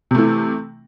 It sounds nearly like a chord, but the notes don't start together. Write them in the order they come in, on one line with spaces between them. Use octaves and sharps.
C3 A3 E3